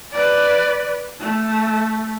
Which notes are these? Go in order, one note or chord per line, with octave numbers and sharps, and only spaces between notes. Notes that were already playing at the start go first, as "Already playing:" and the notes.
B4 D5
A3